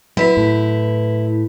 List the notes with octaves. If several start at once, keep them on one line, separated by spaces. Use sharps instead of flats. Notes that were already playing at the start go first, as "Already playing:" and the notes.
F#3 E4 B4 B6
A2